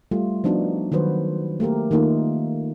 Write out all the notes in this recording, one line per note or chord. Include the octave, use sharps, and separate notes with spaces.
G3 A3 F4
F3 B3 D4 D#4 F#4
D#3 F#3 F#4 B4 C5
A3 A#3 G4 A#4
D#3 A3 A#3 D#4 F4